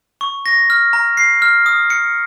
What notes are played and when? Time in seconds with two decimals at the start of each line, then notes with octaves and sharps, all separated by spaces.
0.21 C#6
0.46 A#6
0.70 F6
0.93 A#5
1.17 C7
1.42 F6
1.66 D#6
1.90 C#7